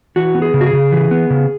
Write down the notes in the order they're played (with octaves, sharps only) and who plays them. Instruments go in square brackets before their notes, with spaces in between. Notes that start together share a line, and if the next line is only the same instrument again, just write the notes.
[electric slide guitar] E3 F#4
B3
G#4
C#3
F#4
G#4
C#3
E3
B3
C#3